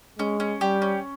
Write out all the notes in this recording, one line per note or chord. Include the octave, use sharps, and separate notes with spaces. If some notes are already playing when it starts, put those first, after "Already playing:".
G#3 C#4
C#4
G3 G4
C#4